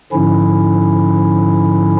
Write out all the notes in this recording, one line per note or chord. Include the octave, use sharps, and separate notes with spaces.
G#2 D3 F3 C#4 E4